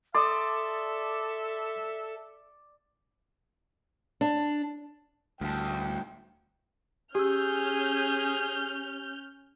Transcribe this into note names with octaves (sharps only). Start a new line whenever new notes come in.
A4 D5 E5 C6 D#6
D4
D2 A2 G3 G5 A5
C#4 G4 G#4 E6 F6 G6